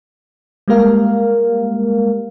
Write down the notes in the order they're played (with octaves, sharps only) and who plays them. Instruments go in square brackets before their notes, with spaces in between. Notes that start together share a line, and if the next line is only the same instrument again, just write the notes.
[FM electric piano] G3 G#3 A#3 G4 A#4 F5